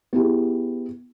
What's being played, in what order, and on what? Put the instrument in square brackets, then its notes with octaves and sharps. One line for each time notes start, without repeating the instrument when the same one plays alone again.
[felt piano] B3 E4 G4 G#4